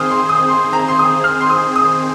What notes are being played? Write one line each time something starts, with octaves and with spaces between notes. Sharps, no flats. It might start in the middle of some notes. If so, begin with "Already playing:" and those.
Already playing: D#3 C4 G#4 C5 D#6 F6
C6
D#6
C6
A#5
C6
D#6
F6
C6
D#6
D#6